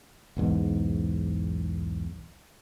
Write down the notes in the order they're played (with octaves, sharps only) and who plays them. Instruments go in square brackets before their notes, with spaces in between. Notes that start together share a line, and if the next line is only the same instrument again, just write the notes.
[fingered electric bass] B1 E2 G#2